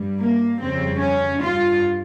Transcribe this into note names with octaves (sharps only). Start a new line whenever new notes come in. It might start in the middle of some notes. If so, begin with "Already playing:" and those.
Already playing: G2 G3
A#3
F2 C#3 G3 C4
C#4
G2 F4